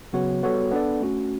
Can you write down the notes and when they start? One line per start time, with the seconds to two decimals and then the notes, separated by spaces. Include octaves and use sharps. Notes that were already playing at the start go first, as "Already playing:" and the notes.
0.13 C#3 F#3 B3 F#4 C#5
0.43 G3 B3 F#4 A4 C#5
0.71 B3 D4 A4 D5
1.01 A3 C#4 F#4